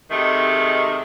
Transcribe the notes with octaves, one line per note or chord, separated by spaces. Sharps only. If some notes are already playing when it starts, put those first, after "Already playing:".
C3 D#3 G#3 A3